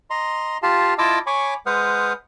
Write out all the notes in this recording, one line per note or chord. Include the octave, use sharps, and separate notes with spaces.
D#5 A#5 C6
F4 G4 F5 A5
E4 F4 D#5 A5 D6 E6
C#5 G#5 B5 C#6 D6
G#3 B4 C5 F#5 D#6 F6